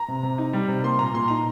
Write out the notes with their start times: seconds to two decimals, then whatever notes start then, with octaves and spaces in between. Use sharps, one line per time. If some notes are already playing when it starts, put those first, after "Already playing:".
Already playing: A#5
0.08 C3
0.23 C3
0.38 D#4
0.53 G3
0.68 C3
0.83 A#3 C6
0.99 A#2 A#5
1.14 A#2 C6
1.28 D#4 A#5